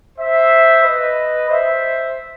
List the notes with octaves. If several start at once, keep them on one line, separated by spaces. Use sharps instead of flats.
C5 E5
B4 D#5
C5 E5